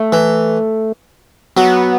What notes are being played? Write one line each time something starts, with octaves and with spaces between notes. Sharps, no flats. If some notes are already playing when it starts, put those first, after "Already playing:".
Already playing: A3
E3
F#3 B3